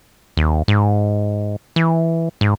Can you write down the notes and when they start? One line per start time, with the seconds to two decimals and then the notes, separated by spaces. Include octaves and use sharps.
0.37 D#2
0.68 G#2
1.76 E3
2.41 G#2